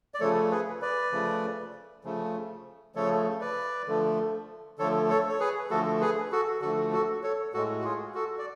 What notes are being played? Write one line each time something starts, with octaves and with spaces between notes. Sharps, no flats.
D5
C#3 F3 A3 A4 C#5
G#4 B4
B4 D5
C#3 F3 A3
C#3 F3 A3
C#3 F3 A3 A4 C#5
B4 D5
D3 F3 A3
D3 F3 A3 A4 C#5
A4 C#5
C#5
G#4 B4
D3 F3 A3 F#4 A4
G#4 B4
F#4 A4
D3 F3 A3 F#4 A4
F#4 A4
A4 C#5
A2 G#3 F#4 A4
F#4
F4 G#4
F#4 A4
D5